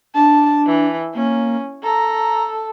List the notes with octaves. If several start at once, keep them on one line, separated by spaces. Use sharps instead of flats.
D4 A5
E3
A#3 C#4
A4 A#5